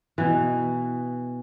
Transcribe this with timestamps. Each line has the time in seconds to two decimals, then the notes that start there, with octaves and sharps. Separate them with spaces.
0.18 B2 E3